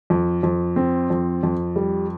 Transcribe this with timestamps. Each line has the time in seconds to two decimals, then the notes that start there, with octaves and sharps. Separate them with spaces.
0.10 F2
0.43 F2
0.76 C4
1.10 F2
1.43 F2
1.76 G3